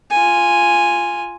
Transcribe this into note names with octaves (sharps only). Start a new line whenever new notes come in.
F4 G#5